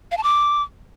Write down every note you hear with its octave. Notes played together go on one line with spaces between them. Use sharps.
F5
A5
D6